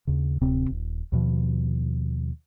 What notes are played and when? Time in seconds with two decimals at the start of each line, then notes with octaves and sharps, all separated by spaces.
0.07 D#2 C#3
0.41 D1 C3 C4
0.70 D#1
1.12 D#2 B2 F3